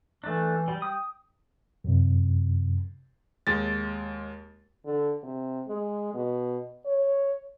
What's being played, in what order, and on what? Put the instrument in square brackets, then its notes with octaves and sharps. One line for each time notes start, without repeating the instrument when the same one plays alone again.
[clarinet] E3 [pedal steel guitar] A3 D4
[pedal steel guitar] G3
[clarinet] G5 [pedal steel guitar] D#6
[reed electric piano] F#2 C3
[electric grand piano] D#2 G#3 A6
[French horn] D3
C3
G#3
B2
C#5